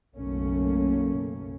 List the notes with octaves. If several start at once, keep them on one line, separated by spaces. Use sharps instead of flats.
F#1 B1 A3 A#3 C#4